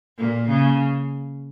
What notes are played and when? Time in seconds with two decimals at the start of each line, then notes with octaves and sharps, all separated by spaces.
0.18 A#2 A#3
0.49 C#3